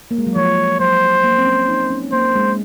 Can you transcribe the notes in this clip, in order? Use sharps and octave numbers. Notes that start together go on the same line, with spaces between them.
A#3
G#3
F#3
F3 C#5
F#3 C5
A#3
C4
C#4
D#4
C#4
A#3 C5
G#3